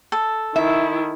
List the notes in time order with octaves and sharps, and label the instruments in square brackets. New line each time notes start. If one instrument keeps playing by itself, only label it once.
[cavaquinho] A4
[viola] D#3 E4 [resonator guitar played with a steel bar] E5